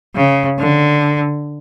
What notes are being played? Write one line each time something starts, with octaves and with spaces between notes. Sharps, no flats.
C#3
D3